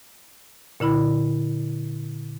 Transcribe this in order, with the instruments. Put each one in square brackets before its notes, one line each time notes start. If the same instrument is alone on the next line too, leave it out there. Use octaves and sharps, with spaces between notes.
[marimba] A#2 D3 E4 B5